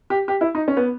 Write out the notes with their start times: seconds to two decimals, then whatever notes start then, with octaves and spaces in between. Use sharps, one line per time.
0.10 G4
0.28 G4
0.41 E4
0.55 D#4
0.68 C#4
0.77 B3